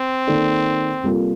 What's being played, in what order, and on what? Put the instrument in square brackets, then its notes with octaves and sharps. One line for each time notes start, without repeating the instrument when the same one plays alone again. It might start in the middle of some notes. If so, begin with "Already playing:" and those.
Already playing: [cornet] C4
[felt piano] D#3 A#3 D#4 A4 D5
C3 G3 A#3 F4 A4